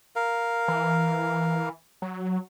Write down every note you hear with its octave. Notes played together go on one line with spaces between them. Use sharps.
A#4 F5
E3
F#3